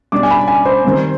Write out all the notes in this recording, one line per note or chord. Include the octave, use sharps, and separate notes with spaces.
B2 G3 D4 D6
G#5
B5
G#5
C5
D#3 G3 C4